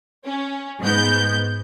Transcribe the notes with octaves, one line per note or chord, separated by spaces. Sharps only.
C#4
G#2 B3 G6